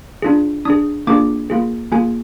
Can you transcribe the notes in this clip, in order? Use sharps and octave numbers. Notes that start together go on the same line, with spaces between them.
D4 F4 G#4
D4 G#4 D#6
A#3 D4 F4 G#4 D6
A#3 F4 G#4
A#3 F4 G#4 G#5